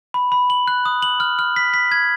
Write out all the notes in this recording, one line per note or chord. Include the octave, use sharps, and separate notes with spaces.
B5
B5
F#7
F#6
D#6
F#7
F6
F6
B6
B6
G#6